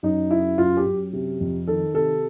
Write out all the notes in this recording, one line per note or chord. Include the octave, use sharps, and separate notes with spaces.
F#2 D#4
C#3 E4
F#2 F4
G4
F#2
C3
F2
D#3 A4
C3 A4